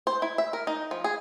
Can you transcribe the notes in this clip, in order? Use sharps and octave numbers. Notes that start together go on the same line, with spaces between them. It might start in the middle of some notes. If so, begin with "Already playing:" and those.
C5
E4
E5
A#4
D#4
F3
G#4